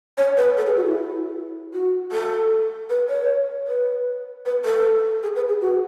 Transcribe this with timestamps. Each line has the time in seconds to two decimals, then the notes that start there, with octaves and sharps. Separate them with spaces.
0.18 C#5
0.37 B4
0.57 A4
0.66 G#4
0.77 F#4
0.86 E4
1.73 F#4
2.12 A4
2.90 B4
3.09 C#5
3.67 B4
4.46 B4
4.65 A4
5.23 G#4
5.36 B4
5.49 G#4
5.62 F#4